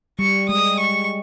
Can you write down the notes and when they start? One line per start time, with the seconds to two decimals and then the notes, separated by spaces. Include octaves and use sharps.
0.19 G3 C#6
0.49 G#3 D#6
0.79 C#6